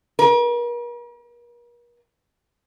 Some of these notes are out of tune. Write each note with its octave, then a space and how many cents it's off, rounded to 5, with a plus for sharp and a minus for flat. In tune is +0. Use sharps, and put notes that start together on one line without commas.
A#4 +45